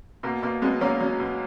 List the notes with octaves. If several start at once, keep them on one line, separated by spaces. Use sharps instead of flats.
B2 A#3
B2 A#3
F#3 G#3 B3
F#3 A#3 C#4
F#3
B2